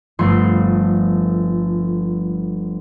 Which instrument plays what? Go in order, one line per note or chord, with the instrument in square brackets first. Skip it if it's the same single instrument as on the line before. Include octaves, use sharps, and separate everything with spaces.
[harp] G1 F3 A3 C6 C#6